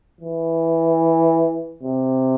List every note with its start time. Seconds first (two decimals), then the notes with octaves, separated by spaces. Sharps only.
0.21 E3
1.83 C3